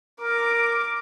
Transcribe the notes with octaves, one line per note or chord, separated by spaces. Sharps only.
A#4 D6